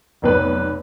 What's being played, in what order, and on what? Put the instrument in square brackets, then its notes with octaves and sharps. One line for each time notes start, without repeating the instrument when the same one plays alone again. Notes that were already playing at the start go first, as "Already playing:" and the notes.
[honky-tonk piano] F1 B1 B4